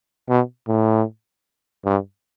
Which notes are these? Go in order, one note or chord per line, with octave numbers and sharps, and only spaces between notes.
B2
A2
G2